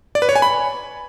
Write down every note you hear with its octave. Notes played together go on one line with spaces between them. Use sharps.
D5
B4
C#5
G#5
B5